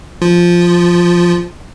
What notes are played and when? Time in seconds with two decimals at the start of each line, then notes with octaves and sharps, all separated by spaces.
0.22 F3 F4